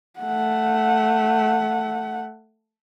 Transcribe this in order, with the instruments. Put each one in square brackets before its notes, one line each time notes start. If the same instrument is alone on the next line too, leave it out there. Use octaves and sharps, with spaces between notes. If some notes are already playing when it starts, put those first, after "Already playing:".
[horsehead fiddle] A3 F#5